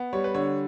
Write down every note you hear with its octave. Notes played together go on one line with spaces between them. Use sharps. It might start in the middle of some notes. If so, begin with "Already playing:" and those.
Already playing: B3
G3 C#5
B4
D3 C#5